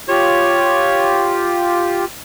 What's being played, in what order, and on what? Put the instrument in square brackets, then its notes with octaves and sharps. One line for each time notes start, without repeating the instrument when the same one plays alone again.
[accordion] F4 G4 [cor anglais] C#5